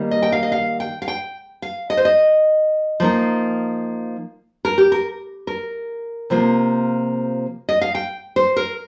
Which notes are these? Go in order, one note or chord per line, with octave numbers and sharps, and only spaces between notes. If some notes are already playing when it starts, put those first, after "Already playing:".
Already playing: D#3 G3 A#3
D#5
G5
F5
D#5
F5
G5
F5
G5
F5
D#5
C5
D#5
F3 A#3 D#4
A#4
G4
A#4
A#4
C3 F3 A#3 F4
D#5
F5
G5
C5
A#4